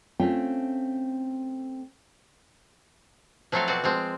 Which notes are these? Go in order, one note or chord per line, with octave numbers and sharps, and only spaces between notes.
A3 C4 C#4 F4 C5 G5
F3 F#3 A3 C4 A4 F5
B2 C4 F#4 D5
F3 G#3 C4